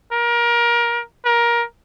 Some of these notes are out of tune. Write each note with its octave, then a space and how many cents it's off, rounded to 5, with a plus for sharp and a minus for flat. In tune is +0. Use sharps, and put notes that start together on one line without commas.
A#4 +25
A#4 +20